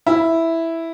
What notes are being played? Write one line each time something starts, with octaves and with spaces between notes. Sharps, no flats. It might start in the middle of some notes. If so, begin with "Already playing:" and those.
E4